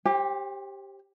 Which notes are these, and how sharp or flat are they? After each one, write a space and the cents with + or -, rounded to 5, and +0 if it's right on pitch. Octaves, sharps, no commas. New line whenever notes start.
G4 +0 C5 +40 G5 +40